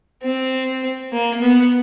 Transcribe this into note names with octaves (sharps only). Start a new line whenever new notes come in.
C4
A#3
B3